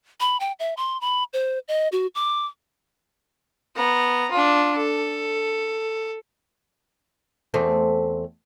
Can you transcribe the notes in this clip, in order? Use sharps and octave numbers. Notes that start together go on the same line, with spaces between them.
B5
G5
E5
C6
B5
C5
D#5
F#4
D6
B3 A#5
D4 F4
A4
E2 A3 C4